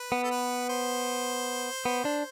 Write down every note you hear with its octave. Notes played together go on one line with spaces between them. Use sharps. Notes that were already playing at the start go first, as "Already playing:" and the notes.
Already playing: B4
B3
A4
B4
C5
B3
D4